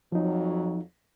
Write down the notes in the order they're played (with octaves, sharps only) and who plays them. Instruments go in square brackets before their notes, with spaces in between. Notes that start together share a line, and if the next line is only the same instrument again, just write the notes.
[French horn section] F2 F#3 [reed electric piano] F3 D#4